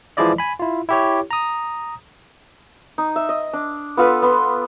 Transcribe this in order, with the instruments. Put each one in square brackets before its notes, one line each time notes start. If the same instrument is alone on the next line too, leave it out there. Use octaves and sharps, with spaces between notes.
[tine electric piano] E3 F3 G#3 E4 D5 D#5
G#5 B5
E4 F4
E4 G4 C#5
A#5 D#6
[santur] D#4
E5
D#5
D4
B3 F4 A4 B4
B3 C6